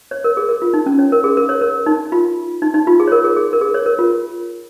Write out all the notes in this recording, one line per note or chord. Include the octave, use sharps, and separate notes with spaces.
C#5
A#4
G#4
A#4
F4
D#4
C#4
C#5
A#4
G#4
A#4
C#5
A#4
D#4
F4
D#4
D#4
F4
G#4
C#5
A#4
G#4
G#4
A#4
G#4
C#5
A#4
F4